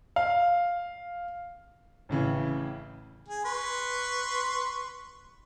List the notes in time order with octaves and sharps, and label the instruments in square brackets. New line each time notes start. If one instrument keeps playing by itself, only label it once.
[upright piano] F5
[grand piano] A1 A2 C#3 E3
[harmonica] G#4
B4 C6 C#6